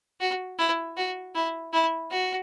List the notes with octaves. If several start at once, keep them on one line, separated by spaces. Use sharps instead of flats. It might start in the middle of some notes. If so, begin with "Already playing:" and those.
F#4
E4
F#4
E4
E4
F#4